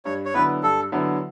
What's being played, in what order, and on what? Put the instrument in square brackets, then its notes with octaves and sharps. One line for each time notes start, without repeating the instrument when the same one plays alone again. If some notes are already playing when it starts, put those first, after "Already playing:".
[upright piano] G2 [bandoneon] C#5
[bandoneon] C#5
[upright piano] D3 F#3 B3 E4 [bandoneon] B4
[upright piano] G2 [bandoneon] A4
[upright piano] D3 F#3 B3 E4